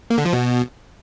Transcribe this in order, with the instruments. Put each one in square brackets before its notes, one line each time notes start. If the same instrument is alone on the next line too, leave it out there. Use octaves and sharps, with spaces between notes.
[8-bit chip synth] A#3
D3
F3
B2